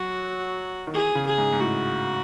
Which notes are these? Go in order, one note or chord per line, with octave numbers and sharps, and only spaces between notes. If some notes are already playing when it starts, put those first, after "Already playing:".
Already playing: F#3 F#4
D#3
E3 G#4
C#3
G#4
G#2
G#2
A2 F#4